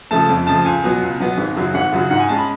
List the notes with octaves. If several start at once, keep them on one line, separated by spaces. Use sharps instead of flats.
C#3 F3 A3 A5
F2
C#3 F3 A3 A5
C#2 G#5
B2 F#3 B3
C#2
B2 F#3 B3
G#1
F#2 C#3 F#3
G#1 F#5
F#2 C#3 F#3
G#2 F#5
G#5
G#3 C#4 A5
B5